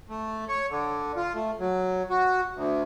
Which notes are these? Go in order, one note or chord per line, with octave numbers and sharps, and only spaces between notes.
A3
C#5
D3
F4
A3
F#3
F#4
D2